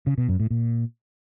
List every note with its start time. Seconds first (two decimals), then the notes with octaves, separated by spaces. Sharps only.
0.07 C#3
0.18 B2
0.29 F#2
0.40 A2
0.51 A#2